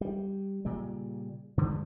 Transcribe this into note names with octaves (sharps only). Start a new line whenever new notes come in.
G3
A#2 C#3 G3
G2 D3 F3 G#3